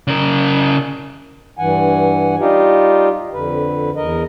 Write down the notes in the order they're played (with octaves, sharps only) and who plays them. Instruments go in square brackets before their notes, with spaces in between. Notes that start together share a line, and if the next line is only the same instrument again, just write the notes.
[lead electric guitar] C#3 A#4
[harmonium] G2 E3 F#5 G#5
G3 D#4 F4 G4
F2 D3 B4
E2 A#4 D#5